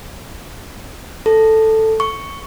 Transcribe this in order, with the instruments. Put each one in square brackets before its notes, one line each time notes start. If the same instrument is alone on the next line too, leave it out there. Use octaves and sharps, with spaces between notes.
[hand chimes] A4
C#6